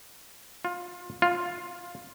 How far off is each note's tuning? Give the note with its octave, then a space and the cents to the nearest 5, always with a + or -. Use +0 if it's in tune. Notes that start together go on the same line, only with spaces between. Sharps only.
F4 +25
F4 +10